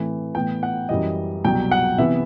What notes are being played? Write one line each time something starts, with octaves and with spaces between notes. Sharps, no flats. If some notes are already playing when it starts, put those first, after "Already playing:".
Already playing: A2 E3 A3 C4
A2 E3 B3 G5
F#5
F#2 E3 G3 D#5
C2 B2 F#3 G5
F#5
C3 E3 B3 E5